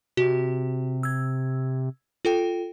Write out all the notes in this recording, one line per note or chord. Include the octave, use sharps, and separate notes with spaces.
C3 F#4
E6 G#6
F4 A4 G5